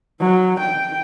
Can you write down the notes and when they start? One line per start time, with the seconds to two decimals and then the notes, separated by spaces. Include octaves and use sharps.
0.20 F#3
0.60 G5